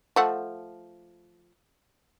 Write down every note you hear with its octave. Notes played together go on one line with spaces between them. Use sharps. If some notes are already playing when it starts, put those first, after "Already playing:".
F3 A3 F#5